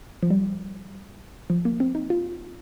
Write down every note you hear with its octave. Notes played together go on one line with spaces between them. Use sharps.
F3
G3
F3
A#3
C4
D#4
F4